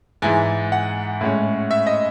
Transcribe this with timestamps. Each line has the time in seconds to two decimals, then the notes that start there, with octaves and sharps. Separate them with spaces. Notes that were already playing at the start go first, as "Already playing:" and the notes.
0.22 G#2 E3 G#3 G#5
0.72 F#5
1.21 A2 G#3 C#4
1.71 E5
1.87 D#5